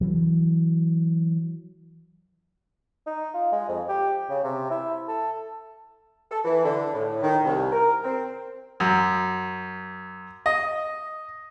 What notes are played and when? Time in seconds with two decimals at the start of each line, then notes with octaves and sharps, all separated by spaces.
0.01 E3 F#3
3.07 D#4
3.34 F4
3.52 G#3
3.68 F2
3.89 G4
4.30 C#3
4.44 C3
4.70 E4
5.08 A4
6.30 A4
6.45 E3
6.65 D3
6.94 A2
7.23 D#3
7.45 C2
7.72 A#4
8.03 C4
8.80 F#2
10.46 D#5